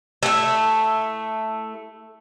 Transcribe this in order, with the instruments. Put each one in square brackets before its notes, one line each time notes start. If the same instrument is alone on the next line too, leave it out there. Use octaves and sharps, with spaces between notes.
[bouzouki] A3 E4